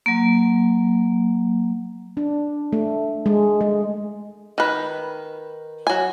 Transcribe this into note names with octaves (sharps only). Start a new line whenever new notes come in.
F#3 A#3
D4
A3
G#3
G#3
D#3 B4
F#3 G#5